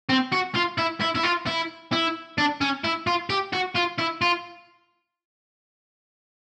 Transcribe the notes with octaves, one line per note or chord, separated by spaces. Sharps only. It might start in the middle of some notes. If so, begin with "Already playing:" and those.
C4
F#4
F4
E4
E4
E4
F4
E4
E4
D4
C#4
E4
F4
G4
F#4
F4
E4
F4